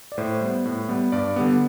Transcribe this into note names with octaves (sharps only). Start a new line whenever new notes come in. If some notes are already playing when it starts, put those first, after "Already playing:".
D5
A2 C5
G3 B3
A2
G3 B3
G2 D5
D3 G3 B3